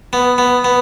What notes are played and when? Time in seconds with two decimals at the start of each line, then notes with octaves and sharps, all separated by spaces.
0.13 B3
0.38 B3
0.65 B3